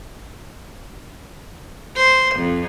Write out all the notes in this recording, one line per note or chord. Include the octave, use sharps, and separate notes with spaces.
C5
F2